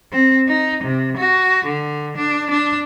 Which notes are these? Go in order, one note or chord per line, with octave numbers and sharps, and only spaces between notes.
C4
D#4
C3
F#4
D3
D4
D4